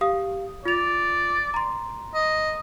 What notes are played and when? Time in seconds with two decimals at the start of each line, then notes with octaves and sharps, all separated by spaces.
0.01 G4 F5 D#6
0.65 F4 D5 F7
1.54 A#5 C6
2.14 D#5